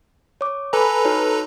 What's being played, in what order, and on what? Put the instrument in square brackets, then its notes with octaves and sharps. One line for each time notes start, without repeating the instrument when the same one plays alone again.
[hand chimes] C#5 D6
[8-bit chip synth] A4 B4 A#5 [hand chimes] G#5 B5
[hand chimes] D#4 F#4 C#5